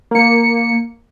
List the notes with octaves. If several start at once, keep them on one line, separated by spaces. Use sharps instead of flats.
A#3 C#7